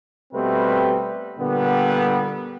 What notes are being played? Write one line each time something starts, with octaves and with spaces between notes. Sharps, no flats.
B2 G3 A3 C4 B4
A#2 D3 G3 B3